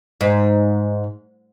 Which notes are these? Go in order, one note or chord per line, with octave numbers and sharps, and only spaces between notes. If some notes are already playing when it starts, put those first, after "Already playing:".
G#2